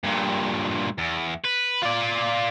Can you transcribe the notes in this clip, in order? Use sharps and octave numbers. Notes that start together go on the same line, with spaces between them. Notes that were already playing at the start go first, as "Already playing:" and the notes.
G2 A#2
E2
B4
F4 D5